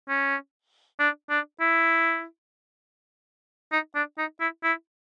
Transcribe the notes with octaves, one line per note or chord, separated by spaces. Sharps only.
C#4
D4
D4
E4
D#4
D4
D#4
E4
E4